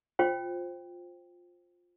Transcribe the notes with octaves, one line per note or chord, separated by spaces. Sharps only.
F4 C5 G5